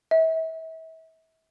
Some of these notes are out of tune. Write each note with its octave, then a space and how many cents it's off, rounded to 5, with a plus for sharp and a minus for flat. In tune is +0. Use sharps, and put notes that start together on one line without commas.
E5 -35